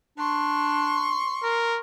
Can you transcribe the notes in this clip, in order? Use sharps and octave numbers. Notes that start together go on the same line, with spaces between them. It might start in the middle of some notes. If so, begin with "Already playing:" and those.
D4 C6 C#6
A#4